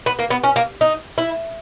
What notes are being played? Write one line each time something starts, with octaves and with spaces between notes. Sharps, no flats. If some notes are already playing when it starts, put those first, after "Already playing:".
B3
A#3
B3
C#4
A#3
D#4
E4